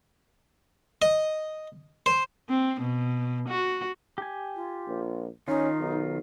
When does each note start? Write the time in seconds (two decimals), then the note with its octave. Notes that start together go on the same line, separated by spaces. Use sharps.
1.02 D#5
2.06 C5
2.50 C4
2.81 B2
3.48 F#4
4.18 G4 G#5
4.55 F4
4.87 A#1
5.48 D#3 C#4 D#4 F4
5.80 B1